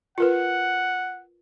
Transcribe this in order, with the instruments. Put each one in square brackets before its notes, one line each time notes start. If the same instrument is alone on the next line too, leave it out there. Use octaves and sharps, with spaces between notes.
[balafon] F4 A#4 B4 [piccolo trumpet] F#5